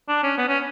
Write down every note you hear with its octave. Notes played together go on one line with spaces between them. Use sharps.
D4
C#4
B3
C#4